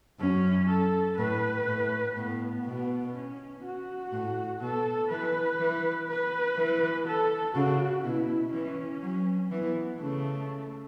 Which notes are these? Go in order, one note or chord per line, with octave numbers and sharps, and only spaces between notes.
F#2 C#4
A4
A2 B4
A2
A2 B3
B2
C#4
F#4
A2
B2 A4
E3 B4
E3
B4
E3
A4
C#3 F#4
B2 E4
E3 C#4
F#3
E3 B3
C#3 A3